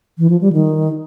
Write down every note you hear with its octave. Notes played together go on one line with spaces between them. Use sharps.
E3
F3
G3
D#3